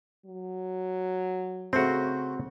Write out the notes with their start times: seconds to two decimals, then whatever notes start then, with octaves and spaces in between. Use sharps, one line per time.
0.26 F#3
1.73 C#3 A3 C4 F#4 C5